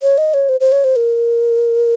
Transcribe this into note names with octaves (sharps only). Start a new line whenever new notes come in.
C#5
D#5
C#5
C5
C5
C#5
C5
A#4